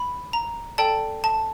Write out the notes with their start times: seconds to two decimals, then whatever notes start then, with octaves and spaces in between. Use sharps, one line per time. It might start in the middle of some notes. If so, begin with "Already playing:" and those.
Already playing: B5
0.33 A#5
0.78 A4 D5 G5 A5
1.24 A5